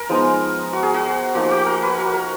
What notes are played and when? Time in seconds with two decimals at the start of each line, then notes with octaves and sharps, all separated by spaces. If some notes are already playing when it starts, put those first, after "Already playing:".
Already playing: A#4
0.09 F3 G#3 B3 D#4
0.73 F#4
0.83 G#4
0.94 F#4
1.35 F3 A#3 D#4 F#4
1.51 F#4
1.66 A#4
1.82 B4
1.98 A#4
2.14 A#4